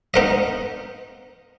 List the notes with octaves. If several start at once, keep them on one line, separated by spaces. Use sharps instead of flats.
B3 D#4 A#4 D#5